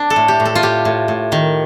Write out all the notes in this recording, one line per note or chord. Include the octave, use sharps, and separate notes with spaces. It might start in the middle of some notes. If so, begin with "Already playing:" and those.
Already playing: D4
A4
A2
G4
A2
A4
F4
A2 G4
A2
A2
D#3